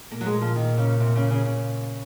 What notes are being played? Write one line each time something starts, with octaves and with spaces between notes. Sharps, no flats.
A#2 A#3
F#3
G#3
F3
D#3
C#3
C3
C#3
C#3
C#3